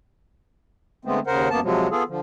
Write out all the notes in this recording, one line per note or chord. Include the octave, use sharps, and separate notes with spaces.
D3 G#3 A3 B3 C4
D#2 C#3 A#4 C5 F#5
F#2 A#3 B3 A5
C3 F3 F#3 G#3
B3 F4 G#4 A4
D3 F3